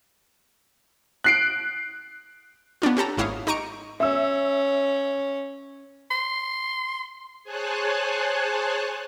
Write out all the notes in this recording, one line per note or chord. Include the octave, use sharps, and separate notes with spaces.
F#6 C7 D7
B3 C#4 D4 F4
C#4 G4 A4 A#5
G#1 A#3 E4 C#5 F5 D#6
D#4 G4 A#5 C#6 C#7 D7
C#4 E5 E6
C6
G#4 C5 C#5 G#5 A5 F#6